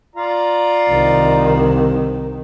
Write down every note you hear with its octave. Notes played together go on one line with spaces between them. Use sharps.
F4 D5 A#5
C2 D#3